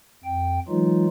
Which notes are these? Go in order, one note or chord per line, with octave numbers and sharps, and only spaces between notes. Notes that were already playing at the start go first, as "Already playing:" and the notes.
F2 G5
E3 F#3 G#3 D#4 F4